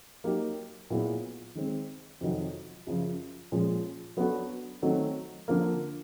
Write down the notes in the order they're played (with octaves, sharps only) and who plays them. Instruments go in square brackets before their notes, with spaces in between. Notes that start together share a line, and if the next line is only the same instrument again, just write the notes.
[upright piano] F#3 A#3 D#4 G4
A#2 F#3 B3 E4 G#4
D#3 G#3 C4
F2 C3 D#3 F#3
F#2 C#3 F3
A#2 F3 G#3 C#4
F#3 B3 D4 F#4 A4
D#3 F#3 A3 C4
D3 F3 A#3